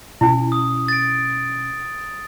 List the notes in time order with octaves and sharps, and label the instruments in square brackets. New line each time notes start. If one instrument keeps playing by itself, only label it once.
[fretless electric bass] B2 C#4 [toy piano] E4 G#5
[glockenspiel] D#6
A6 D7